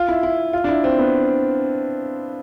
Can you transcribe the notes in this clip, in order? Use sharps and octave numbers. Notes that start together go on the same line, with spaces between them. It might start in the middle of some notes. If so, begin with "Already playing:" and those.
Already playing: F4
E4
E4
F4
D4
E4
C4
B3